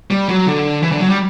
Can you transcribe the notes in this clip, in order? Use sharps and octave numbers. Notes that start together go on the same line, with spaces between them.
G3
F#3
D3
E3
D3
F#3
G3